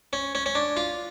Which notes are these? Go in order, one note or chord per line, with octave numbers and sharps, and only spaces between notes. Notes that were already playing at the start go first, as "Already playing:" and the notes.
C#4
C#4
C#4
D4
F4